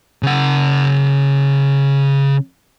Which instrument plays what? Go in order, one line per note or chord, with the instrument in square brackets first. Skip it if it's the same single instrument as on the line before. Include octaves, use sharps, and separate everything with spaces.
[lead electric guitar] C#3 F#5